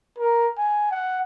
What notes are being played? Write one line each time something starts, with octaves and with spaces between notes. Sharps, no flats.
A#4
G#5
F#5